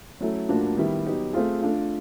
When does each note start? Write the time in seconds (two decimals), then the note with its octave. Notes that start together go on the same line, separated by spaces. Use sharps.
0.21 F#3 A3 C#4 E4
0.49 A2 F3 A#3 D4 F#4
0.77 D#3 G3 B3 E4 G4
1.05 F#3 B3 D#4 G4
1.33 A3 C4 F4 G#4
1.61 A3 D4 F4